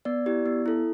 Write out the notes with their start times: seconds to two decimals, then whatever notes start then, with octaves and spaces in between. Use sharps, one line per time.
0.05 B3 D5
0.26 E4 G4
0.46 B3
0.66 E4 A4